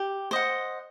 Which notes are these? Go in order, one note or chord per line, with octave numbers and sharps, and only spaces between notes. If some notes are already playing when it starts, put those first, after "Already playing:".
Already playing: G4
C5 D#5 F#5